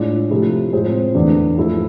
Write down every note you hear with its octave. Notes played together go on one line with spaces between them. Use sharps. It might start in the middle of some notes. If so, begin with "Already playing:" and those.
Already playing: A2 G#3 D4 F4
C3 F3 A3 E4 G#4
A2 G#3 C4 F4 G#4
E2 D3 A3 D4
G#2 F3 A3 E4 A4